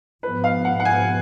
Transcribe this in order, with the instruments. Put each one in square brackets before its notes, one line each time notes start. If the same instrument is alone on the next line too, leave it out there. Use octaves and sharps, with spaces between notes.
[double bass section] G#2 F3 B3 [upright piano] B4
[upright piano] F5
F#5
F#5
G#5